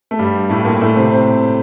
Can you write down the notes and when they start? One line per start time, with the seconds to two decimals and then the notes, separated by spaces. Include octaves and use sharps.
0.11 A3
0.19 G2 G3
0.49 A2 A3
0.65 A#2 A#3
0.81 A2 A3
0.96 C3 C4
1.12 C3 C4